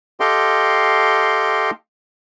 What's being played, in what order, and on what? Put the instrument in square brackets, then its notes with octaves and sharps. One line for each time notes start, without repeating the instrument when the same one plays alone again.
[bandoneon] G4 A4 D#5 F5 G5 C6